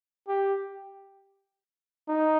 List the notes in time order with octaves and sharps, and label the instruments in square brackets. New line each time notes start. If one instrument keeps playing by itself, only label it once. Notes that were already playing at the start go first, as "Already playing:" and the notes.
[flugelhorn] G4
D#4